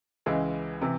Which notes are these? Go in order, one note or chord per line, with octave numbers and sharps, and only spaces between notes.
C#2 C#3 E3 G#3
C3 E3